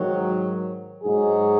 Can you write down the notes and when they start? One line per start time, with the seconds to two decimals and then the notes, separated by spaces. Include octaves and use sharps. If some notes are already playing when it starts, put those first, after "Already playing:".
Already playing: G#2 D#3 F#3
1.03 G#2 F#3 D#4 G#4